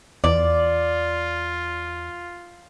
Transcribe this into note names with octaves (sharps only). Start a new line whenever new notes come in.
E2 F4 D5